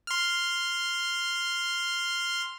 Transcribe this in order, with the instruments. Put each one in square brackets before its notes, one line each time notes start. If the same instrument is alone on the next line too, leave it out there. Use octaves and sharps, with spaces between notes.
[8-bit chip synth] C6 F6